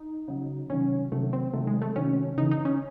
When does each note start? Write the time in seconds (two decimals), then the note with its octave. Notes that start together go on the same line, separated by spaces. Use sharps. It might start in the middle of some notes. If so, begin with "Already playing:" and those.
Already playing: D#4
0.28 C#3 F#3
0.70 C3 D#3 F#3 C#4
1.12 C3 D#3 F#3 A3
1.33 C4
1.53 C3 D#3 F#3 A3
1.67 G#3
1.82 A3
1.96 C3 D#3 F#3 C#4
2.37 C#3 E3 D#4
2.51 D#4
2.65 C#4